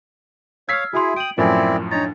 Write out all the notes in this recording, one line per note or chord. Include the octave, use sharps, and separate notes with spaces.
C#5 F5 E6 F6 G#6 B6 C7
E4 F#4 G#4 E5 C6
G5 D#6 D7 F#7
F#2 A2 F3 C4 E4 A#4 D5 G#5
D4 D#4 C#5 A#5 A6